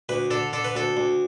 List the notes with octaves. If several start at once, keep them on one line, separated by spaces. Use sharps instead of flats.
D2 B4
D3 A4
D3 A4
B4
D2 A4
D2